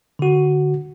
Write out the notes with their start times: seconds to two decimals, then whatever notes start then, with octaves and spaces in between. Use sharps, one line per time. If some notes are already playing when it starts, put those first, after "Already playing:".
0.19 D3 F#4